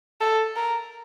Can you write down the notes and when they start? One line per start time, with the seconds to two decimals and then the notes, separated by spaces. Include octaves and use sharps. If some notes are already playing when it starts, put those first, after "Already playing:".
0.21 A4
0.56 A#4